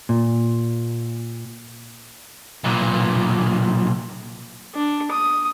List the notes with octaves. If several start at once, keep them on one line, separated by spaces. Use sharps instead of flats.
A#2
B1 A#2
D4
D#6